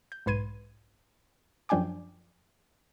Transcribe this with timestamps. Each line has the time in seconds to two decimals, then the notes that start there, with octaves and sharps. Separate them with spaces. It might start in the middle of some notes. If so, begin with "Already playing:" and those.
0.12 G6
0.26 B1 G#2 B4 C6 G#6 D#7
1.69 F#2 F3 D4 G5 G#5 D6